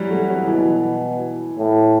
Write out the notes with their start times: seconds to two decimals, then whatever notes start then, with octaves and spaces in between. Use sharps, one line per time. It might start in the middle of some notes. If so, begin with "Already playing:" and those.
Already playing: E3 F#3 G3
0.10 A3
0.28 F#3
0.47 B2 E3
1.58 A2